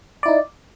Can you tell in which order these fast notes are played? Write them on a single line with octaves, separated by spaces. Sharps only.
D5 E4 D#4